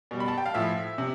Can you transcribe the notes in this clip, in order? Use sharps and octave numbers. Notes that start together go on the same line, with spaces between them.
B2 G3
B5
A5
G5
F5
A2 F3 E5
C3